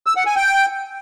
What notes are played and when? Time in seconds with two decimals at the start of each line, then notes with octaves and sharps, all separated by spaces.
0.07 E6
0.16 F#5
0.26 G#5
0.36 G5